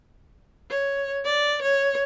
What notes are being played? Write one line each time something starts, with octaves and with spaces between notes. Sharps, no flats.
C#5
D5
C#5